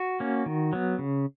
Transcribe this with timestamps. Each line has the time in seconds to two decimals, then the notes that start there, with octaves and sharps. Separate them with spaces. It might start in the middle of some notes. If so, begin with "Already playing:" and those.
Already playing: F#4
0.20 A#3 C#4
0.46 D#3
0.73 F#3 B3
0.99 C#3